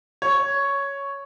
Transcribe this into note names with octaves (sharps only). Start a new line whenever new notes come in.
C#5